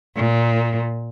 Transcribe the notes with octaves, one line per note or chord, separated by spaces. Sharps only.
A#2